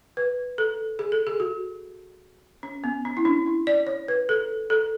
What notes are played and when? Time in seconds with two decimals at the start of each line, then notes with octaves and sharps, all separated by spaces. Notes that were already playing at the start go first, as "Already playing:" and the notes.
0.17 B4
0.58 A4
0.99 G#4
1.12 A4
1.27 G#4
1.40 F#4
2.63 C#4
2.84 B3
3.05 C#4
3.17 E4
3.25 D4
3.46 E4
3.67 D5
3.87 C#5
4.08 B4
4.29 A4
4.70 A4